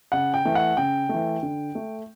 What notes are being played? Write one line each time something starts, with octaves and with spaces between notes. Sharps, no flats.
C#3 F#5
G5
E3 A3
F#5
C#3 G5
E3 A3
D3
A3